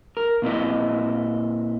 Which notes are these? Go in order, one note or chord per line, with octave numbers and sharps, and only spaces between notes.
A#4
A#2 C4 E4 D#5